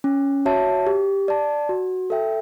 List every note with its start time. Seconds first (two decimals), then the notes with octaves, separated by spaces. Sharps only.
0.04 C#4
0.45 F#4 C#5 E5 A5
0.87 G4
1.28 D5 A5
1.69 F#4
2.10 A4 E5 G5